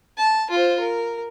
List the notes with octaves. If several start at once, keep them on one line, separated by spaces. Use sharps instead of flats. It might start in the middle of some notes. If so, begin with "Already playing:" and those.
A5
F4 C5
A#4